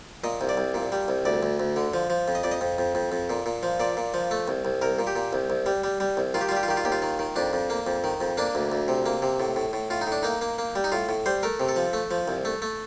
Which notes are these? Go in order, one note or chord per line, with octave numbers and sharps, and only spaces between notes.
A#2 D#5
C2
D5
C2
A#2
G3
C2
D2 D5
D2
D2
D3
F3
F3
F2
D#5
F2 D5
D#5
F2
F2
F2
F2
A#2
A#2
F3
A#2 D5
A#2
F3
A3
C2
C2
C2 A#4
A#2
G4
A#2
C2
C2
G3
G3
G3
C2
D#3 F4
G4
F4
G3
G4
F4
D#3 G4
F4
D#2 G4
F4
D#3
D#3
F2 D4
F2
A#3
F2
D#3
F2
A#3 D4
D2
D2
C3
A#3
C3
A2
A2
A2
A2 F4
D#4
A2 D4
A#3 D#4
A#3
A#3
G3
D#4
A2 F4
A2
G3 C5
A3 A#4
C3
A4
F3
A3
F3
C2
A3
A3